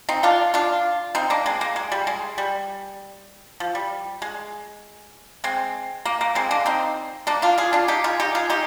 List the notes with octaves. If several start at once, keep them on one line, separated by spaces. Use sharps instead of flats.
C4 D#4
D4 F4
D4 F4
C4 D#4
A#3 D4
G#3 C4
A#3
G#3
G3
G#3
G3
F3
G3
G#3
G#3 C4
A#3
A#3
G#3 C4
A#3 D4
C4 D#4
A#3 D4
D4 F4
F4 G#4
D4 F4
D#4 G4
F4 G#4
D#4 G4
F4 G#4
D#4 G4